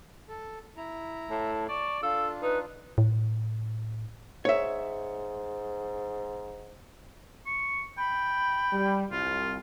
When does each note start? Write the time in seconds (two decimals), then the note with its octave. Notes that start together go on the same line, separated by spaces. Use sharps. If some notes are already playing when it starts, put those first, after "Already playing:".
0.29 A4
0.77 E4 A#5
1.30 A2 A5
1.69 D5 A5 C#6
2.03 D4 F4 A4 F5
2.42 D#4 B4
2.98 A2
4.45 G#2 C#5 E5
7.47 C#6
7.98 G5 B5
8.72 G3
9.11 C2 F4